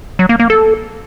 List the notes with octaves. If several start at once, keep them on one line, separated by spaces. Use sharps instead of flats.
F#3
A#3
A#3
A4